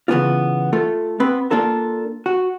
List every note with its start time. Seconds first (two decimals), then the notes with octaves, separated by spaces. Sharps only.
0.08 C#3 E3 B3 C#4 D4 F4
0.73 A3 F4 A4
1.20 B3 C4 B4
1.51 A#3 D4 F4 A4 A#4
2.26 F#4